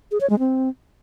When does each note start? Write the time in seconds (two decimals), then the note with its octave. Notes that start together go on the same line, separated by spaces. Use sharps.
0.11 G#4
0.21 C#5
0.30 G#3
0.39 C4